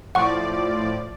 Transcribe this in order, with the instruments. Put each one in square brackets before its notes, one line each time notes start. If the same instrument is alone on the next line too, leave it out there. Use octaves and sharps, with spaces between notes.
[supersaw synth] A2 F3 D5 [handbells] F#5 C#6